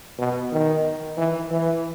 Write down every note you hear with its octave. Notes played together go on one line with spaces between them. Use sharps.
B2
D#3
E3
E3